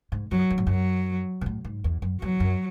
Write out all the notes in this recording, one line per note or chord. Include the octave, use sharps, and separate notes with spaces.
G#2
F#2 F#3
F#2
G#2
F#2 F#3
B2
A2
G#2
E2
F#2
E2 F#3
F#2